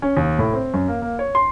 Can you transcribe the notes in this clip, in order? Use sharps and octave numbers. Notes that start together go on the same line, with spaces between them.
C#4
D#2
A2
C4
F#2
A#3
A#3
C#5
C6